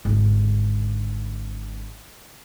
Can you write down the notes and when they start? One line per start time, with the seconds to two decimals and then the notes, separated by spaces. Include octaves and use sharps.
0.05 G#1 D3